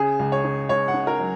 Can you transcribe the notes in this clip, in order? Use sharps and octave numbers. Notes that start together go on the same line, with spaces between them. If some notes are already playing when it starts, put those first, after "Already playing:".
Already playing: C#3 G#4
C#2
C#5
C#3
C#2 C#5
F#5
C#3
A#4
F#3